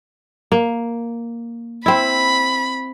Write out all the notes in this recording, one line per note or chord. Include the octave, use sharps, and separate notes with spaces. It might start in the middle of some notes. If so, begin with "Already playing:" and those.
A#3
C4 E4 B5